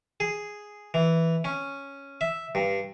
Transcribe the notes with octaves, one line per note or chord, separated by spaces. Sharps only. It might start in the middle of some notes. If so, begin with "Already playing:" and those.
G#4
E3
C#4
E5
G2